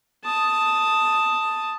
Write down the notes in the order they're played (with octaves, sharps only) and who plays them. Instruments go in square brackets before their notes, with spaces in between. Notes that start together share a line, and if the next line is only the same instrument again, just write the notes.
[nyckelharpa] A5 D#6